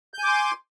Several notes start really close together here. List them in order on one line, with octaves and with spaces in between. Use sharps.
G6 G#5 D6 C6